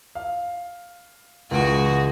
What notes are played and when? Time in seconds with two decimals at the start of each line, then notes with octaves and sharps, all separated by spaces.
0.15 F5
1.51 C#2 E3 G#3 F#4 D7